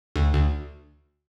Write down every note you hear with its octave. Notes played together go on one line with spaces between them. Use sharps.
D2
D2